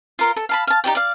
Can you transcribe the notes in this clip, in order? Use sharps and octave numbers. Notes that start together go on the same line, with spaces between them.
F4 A#4 C6
A4
F5 A5 B5
F5 A5
D#4 G4 D5 G5
D5 F5